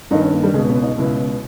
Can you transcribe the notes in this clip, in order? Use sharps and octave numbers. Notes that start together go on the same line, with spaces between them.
G2 D#3 D#4
C#4
A#3
G3
C#2 B2 G#3
B3
D#4
C#2 B2 E4